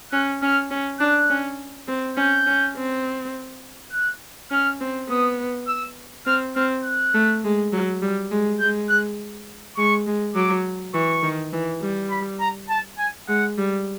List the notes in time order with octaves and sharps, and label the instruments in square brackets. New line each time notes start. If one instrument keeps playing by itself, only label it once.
[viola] C#4 [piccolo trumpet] F#6
[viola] C#4 [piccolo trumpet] F6
[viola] C#4
[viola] D4 [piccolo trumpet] F#6
[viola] C#4
C4
[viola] C#4 [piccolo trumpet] G6
[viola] C#4
C4
[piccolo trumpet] F#6
[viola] C#4 [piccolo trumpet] F6
[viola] C4
[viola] B3 [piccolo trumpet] D#6
[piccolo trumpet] E6
[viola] C4 [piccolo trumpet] F6
[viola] C4 [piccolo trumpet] F6
[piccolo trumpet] F#6
[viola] A3
G#3
F#3
G3
G#3
[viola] G#3 [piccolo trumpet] G6
[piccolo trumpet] F#6
[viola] G#3 [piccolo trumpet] C#6
[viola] G#3
[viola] F#3 [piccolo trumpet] D6
[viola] E3 [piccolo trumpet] C#6
[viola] D#3
E3
G3
[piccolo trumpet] B5
A#5
A5
G#5
[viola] G#3 [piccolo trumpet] F#5
[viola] G3